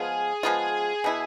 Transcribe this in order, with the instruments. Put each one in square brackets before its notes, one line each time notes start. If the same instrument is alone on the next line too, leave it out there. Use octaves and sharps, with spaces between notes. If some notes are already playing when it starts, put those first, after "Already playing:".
Already playing: [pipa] F3 G#3 B3 F4 [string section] G#4
[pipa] F3 G#3 B3 F4
B2 B3 E4